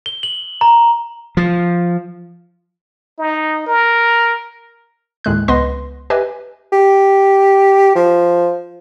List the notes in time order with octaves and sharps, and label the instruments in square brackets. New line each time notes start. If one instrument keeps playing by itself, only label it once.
[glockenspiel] G7
F#7
A#5
[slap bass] F3
[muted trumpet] D#4
A#4
[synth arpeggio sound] D#2 A2 G#3 F#6
C#2 B3 B4 D#5 C6 A#6
G4 B4 D#5 E5 G#5
[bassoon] G4
F3